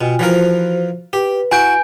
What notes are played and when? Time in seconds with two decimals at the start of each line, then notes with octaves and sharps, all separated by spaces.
0.01 B2 F4 G5 G#5
0.19 E3 F3 F#4 A#4 C5
1.13 G4 B4
1.52 E4 F#4 G#5 G6 D7